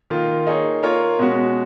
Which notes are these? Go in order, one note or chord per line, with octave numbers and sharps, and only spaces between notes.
D#3 A#3 F4
A#3 D#4 G#4 C#5
A#3 F4 A#4 C#5
B2 G#3 C#4 F#4